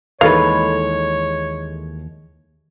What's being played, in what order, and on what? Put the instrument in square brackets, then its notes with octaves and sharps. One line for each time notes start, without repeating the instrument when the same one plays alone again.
[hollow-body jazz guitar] D#2 E3 D#4 [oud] G#3 A4 B4 [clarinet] C#5 [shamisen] F5